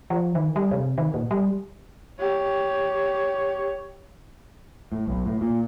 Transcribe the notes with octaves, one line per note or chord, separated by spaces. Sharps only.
F3
D#3
G3
C3
D#3
A#2
G3
G4 C#5
A2
B1
A2
A#2